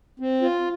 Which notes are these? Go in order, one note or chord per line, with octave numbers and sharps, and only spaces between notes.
C4
F4